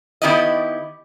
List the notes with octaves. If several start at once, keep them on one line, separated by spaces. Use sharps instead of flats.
D#3 B3 E4 G4 D5 D#5